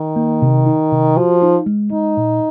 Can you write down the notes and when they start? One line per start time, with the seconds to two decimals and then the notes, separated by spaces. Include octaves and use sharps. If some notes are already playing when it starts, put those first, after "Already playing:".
Already playing: D#3
0.16 A#3
0.42 C3
0.66 D#4
0.92 C3
1.17 F3 F#4
1.42 D#4
1.66 G#3
1.92 G#3 D#4
2.17 A#2